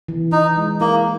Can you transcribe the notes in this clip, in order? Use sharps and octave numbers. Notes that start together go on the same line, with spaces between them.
E3
E3 D#4
G#3
A#3 E4